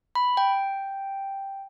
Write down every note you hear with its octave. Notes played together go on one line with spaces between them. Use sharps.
B5
G5